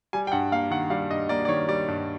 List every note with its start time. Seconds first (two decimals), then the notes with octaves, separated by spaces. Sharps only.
0.13 G3 G#5
0.27 G5
0.32 G2 F#5
0.52 A#3 F5
0.71 D#3 F#5
0.90 G3 F5
1.11 G2 D#5
1.29 A#3 D5
1.45 D5
1.48 D#3 C#5
1.68 G3 D5
1.88 G2